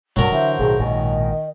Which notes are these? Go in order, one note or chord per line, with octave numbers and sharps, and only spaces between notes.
B1 G2 F#3 A#4
D3 E3 C5 E5
B1 A2 D#3 G#4
A#1 G#2 B2 D#3 D#5